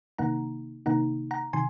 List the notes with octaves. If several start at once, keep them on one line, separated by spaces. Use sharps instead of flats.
C3 D#3 A#3 D#4 F#5 A#5
C3 D#3 A#3 D#4 F#5 A#5
F#5 A#5
C3 D#3 G#5 C6